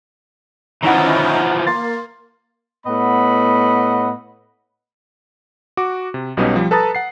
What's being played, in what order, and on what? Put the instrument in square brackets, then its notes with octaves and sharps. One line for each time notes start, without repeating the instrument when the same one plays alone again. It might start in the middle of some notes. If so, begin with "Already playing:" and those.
[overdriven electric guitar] E3 F3 [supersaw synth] C#4 D#4 E4 [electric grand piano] F#5 A#5
[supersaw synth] A#3 [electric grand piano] C6 A6
[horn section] A2 B3 D#5 F#5 B5
[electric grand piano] F#4 D6
C3
B1 B2 G3 B3 C#4 D#4
F3 G3
A4 B4 A5 A#5 D#6 A6
F#5 C7